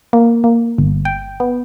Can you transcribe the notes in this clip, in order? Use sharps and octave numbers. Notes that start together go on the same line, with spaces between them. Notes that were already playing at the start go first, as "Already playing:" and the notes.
A#3
A#3
G1
G5
B3